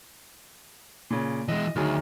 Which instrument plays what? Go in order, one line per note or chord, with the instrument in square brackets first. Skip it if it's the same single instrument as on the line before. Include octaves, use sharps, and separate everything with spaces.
[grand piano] A#2 C#3
[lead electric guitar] E3 G#3 [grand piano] D#5
[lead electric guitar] D2 [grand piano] D#3 F#3 G#4